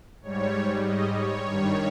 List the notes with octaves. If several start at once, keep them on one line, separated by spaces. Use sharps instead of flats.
G#2 G3 C#5
D#5
C#5
G2 D#3 G3